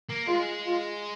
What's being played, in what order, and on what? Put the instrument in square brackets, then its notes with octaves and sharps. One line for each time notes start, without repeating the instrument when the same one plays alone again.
[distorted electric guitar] A#3
[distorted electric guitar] G#3 [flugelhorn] F4
[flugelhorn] F4